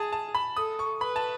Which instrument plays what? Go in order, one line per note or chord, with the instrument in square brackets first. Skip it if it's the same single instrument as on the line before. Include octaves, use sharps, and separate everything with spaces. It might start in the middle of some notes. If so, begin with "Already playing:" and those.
Already playing: [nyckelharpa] G#4 [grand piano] A5
[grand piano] A5
B5
[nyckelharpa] A4 [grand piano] D#6
[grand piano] C#6
[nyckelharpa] B4 [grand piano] B5
[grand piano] A5